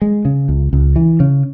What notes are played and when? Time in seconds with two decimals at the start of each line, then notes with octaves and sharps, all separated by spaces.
0.02 G#3
0.25 C#3
0.49 C#2
0.73 C#2
0.96 E3
1.20 C#3